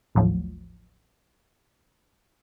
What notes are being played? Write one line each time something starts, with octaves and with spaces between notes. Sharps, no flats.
A1 D#2 A2 F3 F#3